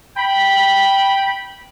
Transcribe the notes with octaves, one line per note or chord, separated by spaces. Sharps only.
G5 B5